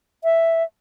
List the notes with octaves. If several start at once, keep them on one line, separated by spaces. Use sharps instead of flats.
E5